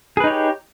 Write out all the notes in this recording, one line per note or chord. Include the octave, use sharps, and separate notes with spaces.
D#4 G4 G#4 B4 C#5